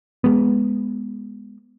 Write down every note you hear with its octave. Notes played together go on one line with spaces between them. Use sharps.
G#3 B3